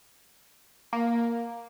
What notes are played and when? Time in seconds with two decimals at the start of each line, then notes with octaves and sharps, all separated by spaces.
0.93 A#3